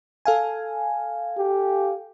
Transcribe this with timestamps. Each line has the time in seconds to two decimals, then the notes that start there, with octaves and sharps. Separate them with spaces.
0.25 A4 F5 G#5
1.38 G4